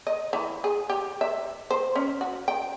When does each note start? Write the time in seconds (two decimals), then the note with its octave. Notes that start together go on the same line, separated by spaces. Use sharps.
0.07 D#5
0.33 E3
0.64 G#4
0.90 G4
1.21 E5
1.71 C5
1.96 C#4
2.21 F#4
2.48 G5